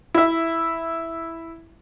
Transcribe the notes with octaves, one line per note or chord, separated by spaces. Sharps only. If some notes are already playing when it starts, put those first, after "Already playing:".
E4 E5